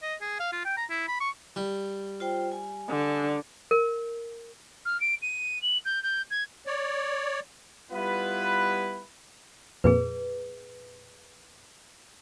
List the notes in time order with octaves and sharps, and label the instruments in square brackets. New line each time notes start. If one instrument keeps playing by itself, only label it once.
[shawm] D#5
G#4
F5
F4
G5
A#5
E4
B5
C#6
[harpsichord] G3
[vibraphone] F4 C5 G5
G#5
[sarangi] D3
[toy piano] A#4
[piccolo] F6
D7
D#7
F#7
G6
G6
G#6
[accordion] C#5 D5
[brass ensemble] G3 B3 E4 F4 B4
[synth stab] F2 A#2 [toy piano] G#4 B4